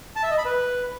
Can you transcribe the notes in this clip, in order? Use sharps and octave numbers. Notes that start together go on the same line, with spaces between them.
A5
E5
D#5
B5
B4